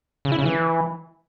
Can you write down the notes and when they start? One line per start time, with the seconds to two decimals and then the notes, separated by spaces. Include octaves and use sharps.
0.25 C#3
0.32 E4
0.39 C#3
0.45 E3